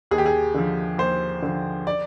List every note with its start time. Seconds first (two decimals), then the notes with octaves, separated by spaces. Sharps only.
0.11 D#2 G#4
0.18 G4
0.26 G#4
0.54 D3 F3
0.98 D#2 C5
1.42 D3 F3
1.87 D5